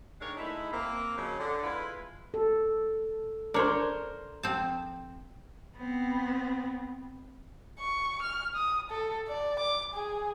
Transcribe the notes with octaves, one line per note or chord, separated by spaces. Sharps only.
D#3 G#3 D4 A#4 C#5 F5
G#3 A3 D#4 E4
A#3 C4
C#3 F3 F#3 G#3 C#4
D3
G#3 E4 F4 B4
A4
D4 A#4 C5 C#5
F3 C4 A5
B3 C4
C#6
F6
D#6
A4
D5
D6
G#4